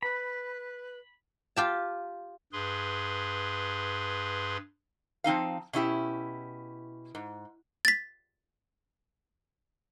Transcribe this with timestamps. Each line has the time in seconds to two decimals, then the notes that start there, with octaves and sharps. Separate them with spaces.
0.03 B4 B5
1.56 F4 G4 A5
2.52 G2 G#4 B4 C6
5.24 F3 C4 D#4 F5
5.73 B2 C#4 E4 G4
7.15 G#2
7.85 A6 B6